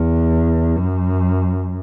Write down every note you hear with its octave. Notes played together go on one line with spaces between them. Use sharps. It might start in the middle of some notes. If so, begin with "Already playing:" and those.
Already playing: E2
F#2